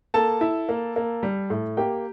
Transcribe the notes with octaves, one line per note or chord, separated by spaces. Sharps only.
A#3 A4 A5
E4
A#3
A#3
G3
A2
A#3 G4 G5